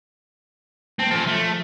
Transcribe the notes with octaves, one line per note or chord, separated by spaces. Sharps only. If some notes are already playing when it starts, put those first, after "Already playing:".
A#3 C4 A5
F3 C#4 A4
A3